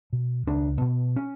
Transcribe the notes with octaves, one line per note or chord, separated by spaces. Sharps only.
B2
C#2 D4
B2
C#4